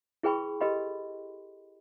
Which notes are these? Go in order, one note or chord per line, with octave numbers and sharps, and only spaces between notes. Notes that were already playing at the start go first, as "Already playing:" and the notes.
E4 G#4 B4 G5 B5 C#6
G4 A4 B4 D#5 B5 C6